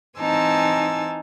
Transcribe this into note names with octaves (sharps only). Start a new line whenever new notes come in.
E3 C4 D#4 G#5 A5 E6